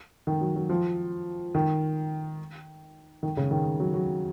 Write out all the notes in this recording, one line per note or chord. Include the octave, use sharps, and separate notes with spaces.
D#3
F#3
F#3
F3
D#3
D#3
C#3
D#3
F#3
F#3